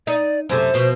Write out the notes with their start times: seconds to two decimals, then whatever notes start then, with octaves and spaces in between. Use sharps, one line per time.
0.07 D#4 D5
0.49 F#2 C3 A3 C5
0.74 B2 F3